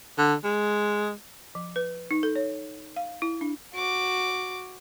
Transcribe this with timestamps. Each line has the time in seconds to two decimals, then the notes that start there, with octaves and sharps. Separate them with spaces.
0.18 D3
0.44 G#3
1.55 F3
1.76 B4
2.11 D#4
2.23 A4
2.36 C#5
2.96 F5
3.22 E4
3.41 D4
3.74 F#4 D6